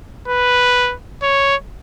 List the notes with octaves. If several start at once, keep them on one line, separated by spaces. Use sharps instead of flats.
B4
C#5